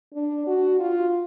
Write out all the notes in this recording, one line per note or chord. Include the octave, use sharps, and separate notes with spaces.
D4
F#4
F4